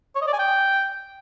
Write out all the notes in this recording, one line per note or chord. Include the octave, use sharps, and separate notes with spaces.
C#5
D#5
D5
G#5
G5